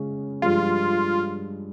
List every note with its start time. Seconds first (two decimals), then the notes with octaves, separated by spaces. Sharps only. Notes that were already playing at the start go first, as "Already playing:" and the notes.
Already playing: C#3 G#3 C#4
0.42 G2 F3 G#3 F4